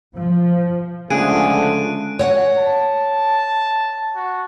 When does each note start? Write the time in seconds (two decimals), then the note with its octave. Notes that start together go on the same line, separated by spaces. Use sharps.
0.16 F3
1.10 C#2 D3 F3 A3 G#4 F#6 D7 D#7
2.19 C#5 F#5 G#5
2.58 A5
4.15 F#4